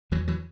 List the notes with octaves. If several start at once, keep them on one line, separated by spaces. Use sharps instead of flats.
E2 E3 F#3
E3 F#3